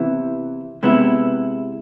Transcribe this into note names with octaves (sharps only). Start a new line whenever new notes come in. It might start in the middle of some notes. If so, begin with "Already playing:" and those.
Already playing: C3 E3 B3 E4
C3 G#3 B3 E4